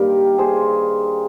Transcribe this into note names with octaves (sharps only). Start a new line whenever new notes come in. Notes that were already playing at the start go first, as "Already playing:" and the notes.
Already playing: G2 D#3 G3 A#3 G4 A#4
G#4 C5